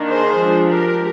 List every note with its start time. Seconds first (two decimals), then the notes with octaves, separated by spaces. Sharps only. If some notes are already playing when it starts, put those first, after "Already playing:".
Already playing: D#3 A#3 D4
0.10 G#4 C5
0.39 F3 G#3 D4
0.68 G4 A#4